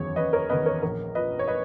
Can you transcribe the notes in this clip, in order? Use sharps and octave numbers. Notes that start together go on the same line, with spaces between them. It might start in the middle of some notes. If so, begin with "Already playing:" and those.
Already playing: F#1 E2 D#3 C#5
F#1 B4 D#5
A#4 C#5
E2 D#3 B4 D#5
A#4 C#5
A#1 A#4
A#2 B4 D#5
C#5
B4 D#5